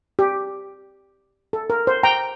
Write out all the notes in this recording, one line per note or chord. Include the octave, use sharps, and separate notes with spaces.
G4
A4
A#4
C5
G5 A#5